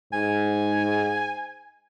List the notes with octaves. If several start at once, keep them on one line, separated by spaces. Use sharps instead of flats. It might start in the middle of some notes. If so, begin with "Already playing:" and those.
G#2 G#5